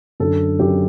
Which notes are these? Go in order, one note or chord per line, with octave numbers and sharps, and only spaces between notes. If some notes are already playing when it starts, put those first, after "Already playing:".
F#2 D3 A4
F#2 D3 G4